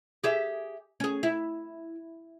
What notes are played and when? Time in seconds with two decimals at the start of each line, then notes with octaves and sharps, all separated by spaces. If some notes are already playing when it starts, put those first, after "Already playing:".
0.24 G4 G#4 E5
1.00 C#4 G#4
1.23 E4